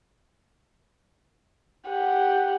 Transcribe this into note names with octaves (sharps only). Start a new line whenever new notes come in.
G4 F#5